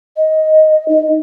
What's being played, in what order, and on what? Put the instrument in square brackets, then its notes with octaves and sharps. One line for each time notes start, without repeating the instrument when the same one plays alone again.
[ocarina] D#5
D#4